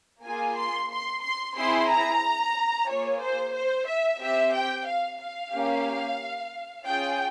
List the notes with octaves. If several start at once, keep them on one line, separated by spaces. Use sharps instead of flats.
A#3 F4 G#4 G#5
C6
C6
C6
C4 E4 G#4 C6
A#5
A#3 F4 G#4 C#5
C5
C5
E5
C4 G4 E5
G5
F5
F5
A#3 C#4 G4
C#4 F4 G#4 G5